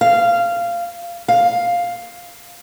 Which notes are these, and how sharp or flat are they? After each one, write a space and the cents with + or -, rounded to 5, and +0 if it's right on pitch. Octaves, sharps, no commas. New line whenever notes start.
F5 -15
F5 +5